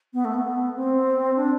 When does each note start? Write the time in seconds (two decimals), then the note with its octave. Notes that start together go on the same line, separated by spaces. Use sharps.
0.13 B3
0.24 A3
0.33 B3
0.75 C4
1.35 D4